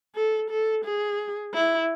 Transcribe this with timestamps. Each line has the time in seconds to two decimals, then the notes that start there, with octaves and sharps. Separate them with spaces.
0.15 A4
0.50 A4
0.84 G#4
1.54 E4